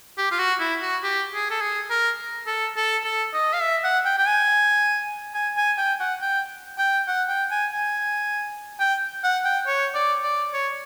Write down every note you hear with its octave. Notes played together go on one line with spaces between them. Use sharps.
G4
F4
F#4
E4
F#4
G4
G#4
A4
G#4
A#4
A4
A4
A4
D#5
F5
E5
F#5
G5
G5
G#5
G#5
G#5
G5
F#5
G5
G5
F#5
G5
G#5
G#5
G5
F#5
G5
C#5
D5
D5
C#5